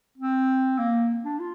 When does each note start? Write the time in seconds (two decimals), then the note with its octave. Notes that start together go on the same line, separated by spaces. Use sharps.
0.18 C4
0.78 A#3
1.25 D4
1.39 F4